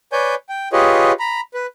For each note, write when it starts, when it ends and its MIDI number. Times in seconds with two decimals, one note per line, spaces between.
0.12 0.35 71
0.12 0.35 73
0.12 0.35 74
0.12 0.35 80
0.12 0.35 91
0.49 0.69 79
0.73 1.12 65
0.73 1.12 67
0.73 1.12 68
0.73 1.12 71
0.73 1.12 73
0.73 1.12 75
1.19 1.41 82
1.19 1.41 83
1.54 1.66 71